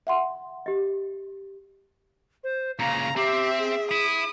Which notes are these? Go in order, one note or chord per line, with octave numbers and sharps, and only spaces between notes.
E5 F#5 C6
G4 D#5
C5
A#2 C#3 F5 A#5
C4 G4 E5
G#4
E4 D#6